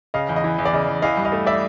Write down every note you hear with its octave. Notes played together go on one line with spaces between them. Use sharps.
C#3 D#5 F5
E2
D#5
E3
E2
D5
C#3 D#5
E2
E3 D#5 F5
G2
D#5 F5
A3
D5 E5